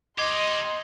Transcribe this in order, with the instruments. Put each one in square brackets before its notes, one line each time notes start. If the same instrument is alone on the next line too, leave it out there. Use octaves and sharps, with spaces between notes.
[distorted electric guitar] D#4 G4 [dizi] D#5 [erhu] C6 [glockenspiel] D6 G#6 C7